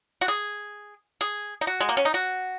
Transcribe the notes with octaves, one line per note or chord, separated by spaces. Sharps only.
F#4
G#4
G#4
D#4
F#4
G#3
A#3
C#4
D#4
F#4